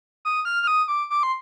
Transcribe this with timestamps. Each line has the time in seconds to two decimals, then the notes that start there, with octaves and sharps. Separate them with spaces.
0.25 D#6
0.45 F6
0.63 F6
0.67 D#6
0.88 D6
1.10 D6
1.23 C6